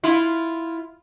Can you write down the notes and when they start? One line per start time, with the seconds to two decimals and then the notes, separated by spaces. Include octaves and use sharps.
0.04 E4 F4